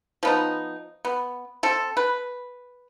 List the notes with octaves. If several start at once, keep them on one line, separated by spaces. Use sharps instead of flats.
F3 B3 D#4
B3
C4 A4
B4